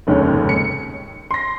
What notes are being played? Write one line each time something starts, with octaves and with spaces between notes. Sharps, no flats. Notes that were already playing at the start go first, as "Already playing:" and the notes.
F1 D#2 G#2 C#3 C#5
C#7
C6 A#6